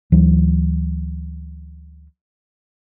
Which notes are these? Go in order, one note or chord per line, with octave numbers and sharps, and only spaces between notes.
D2 E3 F#3